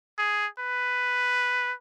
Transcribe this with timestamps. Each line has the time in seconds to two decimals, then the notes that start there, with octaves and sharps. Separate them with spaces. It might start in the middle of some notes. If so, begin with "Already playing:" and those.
0.18 G#4
0.59 B4